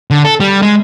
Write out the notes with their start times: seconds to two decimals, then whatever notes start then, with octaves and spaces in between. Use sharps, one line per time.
0.11 D3
0.25 A4
0.40 G3
0.62 G#3